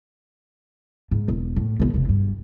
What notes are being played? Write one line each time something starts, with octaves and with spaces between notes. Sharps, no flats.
G#2
E1
A2
B1 D3
F1 C3
G2